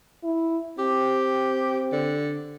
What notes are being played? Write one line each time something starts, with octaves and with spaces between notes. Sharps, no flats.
E4
C4 G4
D3